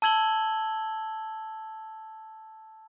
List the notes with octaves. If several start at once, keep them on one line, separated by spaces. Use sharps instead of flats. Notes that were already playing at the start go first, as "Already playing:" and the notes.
A5 E6 G#6 F#7 G7